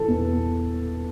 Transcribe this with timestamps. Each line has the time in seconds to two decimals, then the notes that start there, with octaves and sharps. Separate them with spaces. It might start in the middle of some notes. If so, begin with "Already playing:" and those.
Already playing: E3 A4
0.08 E2